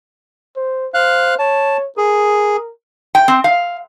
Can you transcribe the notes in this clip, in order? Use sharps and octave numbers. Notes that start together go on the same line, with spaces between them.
C5
C5 F5 F#6
C#5 A5
G#4 A#4
G5
C4
F5